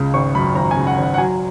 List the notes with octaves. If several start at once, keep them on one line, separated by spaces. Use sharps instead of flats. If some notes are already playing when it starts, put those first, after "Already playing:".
Already playing: C#2 C#3
G#1 C#6
F#2 B5
G#1 A#5
G#5
C#3
F#5
G#1 F#5
F#5
F#3 G#5